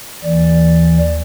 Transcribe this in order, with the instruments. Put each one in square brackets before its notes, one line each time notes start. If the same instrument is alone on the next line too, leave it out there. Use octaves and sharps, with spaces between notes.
[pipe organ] D#2 E3 D5